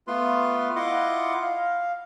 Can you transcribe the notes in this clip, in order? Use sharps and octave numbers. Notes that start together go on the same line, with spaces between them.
A3 B3 F4 B4 C6
E4 F4 D#5 F#5 C6 D6
F5